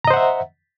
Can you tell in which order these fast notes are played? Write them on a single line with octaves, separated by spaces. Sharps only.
A#5 D#5 C5 F#5 E5